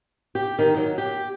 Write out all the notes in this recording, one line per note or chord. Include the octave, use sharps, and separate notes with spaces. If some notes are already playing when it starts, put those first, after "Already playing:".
G4
D#3
F#3
G4